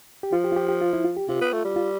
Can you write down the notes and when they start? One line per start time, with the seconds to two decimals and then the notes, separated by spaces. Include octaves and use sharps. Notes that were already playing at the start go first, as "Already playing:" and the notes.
0.23 G4
0.32 F3 F4
0.44 G4
0.52 F4
0.56 G4
0.69 G4
0.81 F4
0.93 E4
1.05 F4
1.17 G4
1.28 C3 F4
1.41 B3
1.52 A3
1.65 G3
1.76 F4